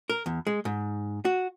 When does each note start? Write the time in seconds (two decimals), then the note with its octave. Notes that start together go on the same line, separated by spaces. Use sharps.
0.10 A#4
0.26 E2
0.47 G#3
0.65 G#2
1.25 F#4